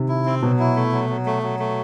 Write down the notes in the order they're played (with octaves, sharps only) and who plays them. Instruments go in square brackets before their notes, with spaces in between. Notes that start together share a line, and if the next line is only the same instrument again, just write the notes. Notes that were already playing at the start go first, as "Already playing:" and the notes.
Already playing: [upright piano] C3 D#3
[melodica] E4
C4
[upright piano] B2 [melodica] F#3
[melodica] E4
A3
F#3
F#3
A3
F#3
A3